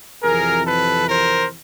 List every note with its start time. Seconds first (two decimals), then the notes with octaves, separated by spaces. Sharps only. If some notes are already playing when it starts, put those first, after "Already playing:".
0.23 F2 C3 E3 G#4 A#4
0.65 A4 B4
1.07 A#4 C5